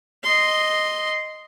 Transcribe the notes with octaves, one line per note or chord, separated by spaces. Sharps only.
D#5 C6